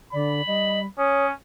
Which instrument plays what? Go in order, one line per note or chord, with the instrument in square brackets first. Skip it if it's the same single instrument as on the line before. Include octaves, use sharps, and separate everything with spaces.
[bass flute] D3 [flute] D5 [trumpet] B5
[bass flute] G3 [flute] D#5
[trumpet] C#4 [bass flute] C#5 [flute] D#6